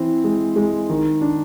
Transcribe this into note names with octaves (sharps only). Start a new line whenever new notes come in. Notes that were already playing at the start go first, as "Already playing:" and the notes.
Already playing: E3 C4
G#3
G#3
D#3
D4